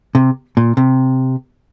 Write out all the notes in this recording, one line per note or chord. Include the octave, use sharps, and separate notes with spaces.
C3
A#2
C3